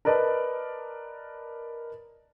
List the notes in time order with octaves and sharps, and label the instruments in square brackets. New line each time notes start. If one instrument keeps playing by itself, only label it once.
[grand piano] A#4 B4 D5 D#5 A5